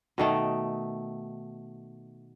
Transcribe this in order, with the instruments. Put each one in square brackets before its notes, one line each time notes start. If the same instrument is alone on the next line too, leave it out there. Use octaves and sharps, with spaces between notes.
[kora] B2 D#3 A3